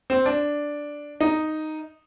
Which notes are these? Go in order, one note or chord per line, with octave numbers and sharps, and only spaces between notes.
C4
D4
D#4